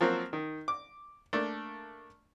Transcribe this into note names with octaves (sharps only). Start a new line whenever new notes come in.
F3 F#3 A#3 C4
D#3
D6
A3 A#3 D4